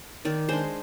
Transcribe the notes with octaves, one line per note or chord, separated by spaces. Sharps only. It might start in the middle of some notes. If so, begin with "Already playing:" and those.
D#3 D5
G#3 D4 C5